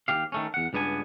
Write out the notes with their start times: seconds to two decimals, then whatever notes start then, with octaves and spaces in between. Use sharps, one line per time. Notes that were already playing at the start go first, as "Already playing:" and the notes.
0.08 D#2 G4 F5
0.32 D#3 A3 C#4
0.54 E2 F#5
0.73 C#2 G2 B3 D4 G#5